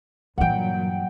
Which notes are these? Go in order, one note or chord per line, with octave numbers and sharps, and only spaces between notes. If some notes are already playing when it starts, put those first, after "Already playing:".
G2 A#2 E3 F#3 F#5 G5